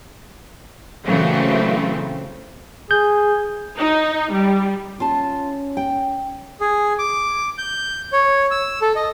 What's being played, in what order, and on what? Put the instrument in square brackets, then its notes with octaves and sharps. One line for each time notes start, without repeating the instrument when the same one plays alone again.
[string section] A#2 C#3 E3 F#3 A3 C4
[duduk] G#4 [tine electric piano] G6
[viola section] D#4
G3
[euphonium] C#4 [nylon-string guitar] F4 A5
[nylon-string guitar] G5
[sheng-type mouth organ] G#4
D6
G6
C#5
E6
A4
D#5